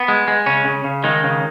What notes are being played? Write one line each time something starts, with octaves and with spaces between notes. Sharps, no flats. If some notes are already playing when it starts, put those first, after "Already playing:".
Already playing: B3
G#3
G#3
C#3 C#4
C#3
C#3
D#3 G#3 D#4
C#3